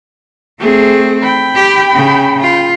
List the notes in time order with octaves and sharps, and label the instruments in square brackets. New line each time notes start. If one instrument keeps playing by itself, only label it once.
[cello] A3 C4 [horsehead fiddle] G#4
[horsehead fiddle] G5 B5
[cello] G4
C#3
F4